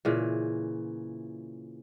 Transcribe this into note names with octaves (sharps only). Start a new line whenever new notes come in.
A#2 C#3 E3